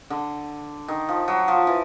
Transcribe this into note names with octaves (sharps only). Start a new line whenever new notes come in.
D3
D#3
F3
F#3
F3
E3